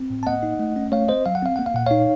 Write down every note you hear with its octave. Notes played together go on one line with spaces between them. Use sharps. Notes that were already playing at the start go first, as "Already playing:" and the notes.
Already playing: C4
A2
A5
A#3 D#5 F#5
D#4
A3
C#4
A3 C#5 F5
C4 C5 D#5
F#3 F5
F#5
C4 F5
A#3 F#5
F5
A#2 F#5
D#4 C#5 F5